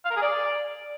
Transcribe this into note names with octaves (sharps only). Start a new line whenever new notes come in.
F5
A#4
G#4
D5